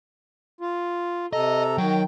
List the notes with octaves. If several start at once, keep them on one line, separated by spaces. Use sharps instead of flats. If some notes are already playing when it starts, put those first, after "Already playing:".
F4
C3 A4 D#5 A#5
D#3 F#3 G5